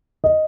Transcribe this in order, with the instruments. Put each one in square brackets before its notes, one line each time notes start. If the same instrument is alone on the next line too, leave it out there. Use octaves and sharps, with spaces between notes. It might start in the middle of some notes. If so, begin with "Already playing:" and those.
[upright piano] D#5